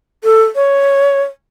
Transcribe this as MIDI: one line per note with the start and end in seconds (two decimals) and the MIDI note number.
0.24 0.43 69
0.55 1.22 73